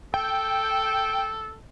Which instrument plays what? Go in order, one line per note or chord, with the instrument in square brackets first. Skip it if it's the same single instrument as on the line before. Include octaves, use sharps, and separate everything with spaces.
[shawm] A4 [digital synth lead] G5